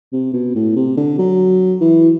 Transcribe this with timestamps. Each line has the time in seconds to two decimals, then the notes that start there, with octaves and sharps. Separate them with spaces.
0.13 C3
0.33 B2
0.55 A2
0.76 C3
0.97 D3
1.18 F#3
1.81 E3